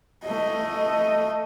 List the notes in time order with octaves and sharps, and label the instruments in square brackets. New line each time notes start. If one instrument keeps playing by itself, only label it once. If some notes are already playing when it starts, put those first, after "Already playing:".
[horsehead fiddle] A3 D#5